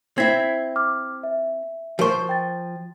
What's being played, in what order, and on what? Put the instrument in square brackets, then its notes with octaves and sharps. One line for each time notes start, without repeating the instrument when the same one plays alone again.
[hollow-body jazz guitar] C4 E4 [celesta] G#6 B6 C7
[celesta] D6 F6
E5
[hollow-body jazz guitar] F3 C5 [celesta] F#4 A#4 C#6
[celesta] G5 A6